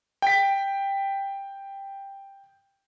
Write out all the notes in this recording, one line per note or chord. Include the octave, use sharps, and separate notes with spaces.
G5 B6